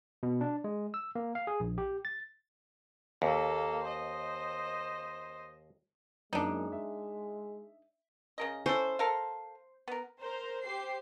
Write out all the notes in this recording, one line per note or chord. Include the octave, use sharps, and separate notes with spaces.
B2
D4
G#3
E6
A#3
F5
G#4
A#1
G4
A6
D#2 A#3 A4
C5 D#5
F#2 G#3 A#3 D4 D#4
E5
C#3 A#4 D#5
C#4 E4 A4 C5
A4 A#4 F5
B3 A#4
A#4 C5 A#5
G4 C5 C7